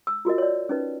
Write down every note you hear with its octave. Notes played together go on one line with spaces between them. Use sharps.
E6
F4 F#4 A#4 D#5
C#5 D5
C#4 D#4 B4